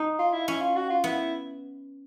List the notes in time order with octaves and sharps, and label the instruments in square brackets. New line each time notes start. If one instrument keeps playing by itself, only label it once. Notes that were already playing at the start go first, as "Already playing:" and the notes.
Already playing: [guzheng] D#4
[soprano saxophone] F4
E4
[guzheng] C#4 [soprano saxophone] E4
[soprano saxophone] F4
F#4
F4
[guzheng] B3 [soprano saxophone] E4